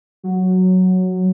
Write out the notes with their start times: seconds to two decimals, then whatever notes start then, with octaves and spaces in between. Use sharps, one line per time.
0.23 F#3